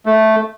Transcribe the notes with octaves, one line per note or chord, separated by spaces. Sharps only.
A3